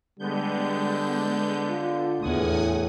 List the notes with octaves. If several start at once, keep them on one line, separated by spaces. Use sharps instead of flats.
D3 G3 G#3 B3 G6
F4
E2 A2 F#5 G#5 D#6